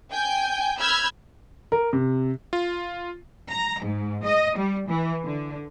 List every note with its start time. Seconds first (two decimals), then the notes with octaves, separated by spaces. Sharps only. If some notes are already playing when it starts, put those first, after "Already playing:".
0.11 G5 G#5 G6
0.79 B5 E6 F6 G6 G#6
1.72 A#4
1.93 C3
2.53 F4
3.52 A#5
3.81 G#2
4.25 D#5
4.58 G3
4.89 E3
5.25 D3